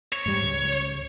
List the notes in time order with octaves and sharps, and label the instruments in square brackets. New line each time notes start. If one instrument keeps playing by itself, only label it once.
[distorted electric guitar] C#5
[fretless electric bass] G#2 G3
C#2